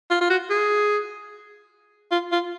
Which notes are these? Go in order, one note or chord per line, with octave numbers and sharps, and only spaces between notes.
F4
F4
F#4
G#4
F4
F4